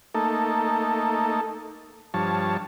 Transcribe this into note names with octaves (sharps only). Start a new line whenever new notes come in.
A3 A#3 D#4 A4
G2 F3 C#5 A5